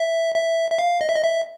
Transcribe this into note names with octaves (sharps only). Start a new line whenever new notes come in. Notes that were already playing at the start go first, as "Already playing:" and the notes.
Already playing: E5
E5
E5
F5
D#5
E5
D#5
E5